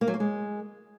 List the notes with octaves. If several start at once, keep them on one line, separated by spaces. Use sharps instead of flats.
A#3
F#3
A#3
G#3